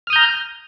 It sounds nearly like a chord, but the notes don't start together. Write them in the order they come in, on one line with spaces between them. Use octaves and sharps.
F6 D#6 G6 A#5